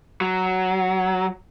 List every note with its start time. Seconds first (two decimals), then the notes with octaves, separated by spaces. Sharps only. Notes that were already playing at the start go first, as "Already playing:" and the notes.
0.21 F#3